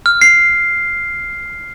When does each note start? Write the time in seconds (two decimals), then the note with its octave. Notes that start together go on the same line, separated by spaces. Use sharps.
0.06 F6
0.21 C7